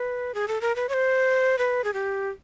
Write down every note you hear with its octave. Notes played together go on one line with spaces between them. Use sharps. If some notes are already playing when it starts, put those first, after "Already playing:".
Already playing: B4
G#4
A4
A#4
B4
C#5
C5
B4
G#4
G4